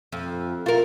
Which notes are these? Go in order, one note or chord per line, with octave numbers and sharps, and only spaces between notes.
F2
F4 A#4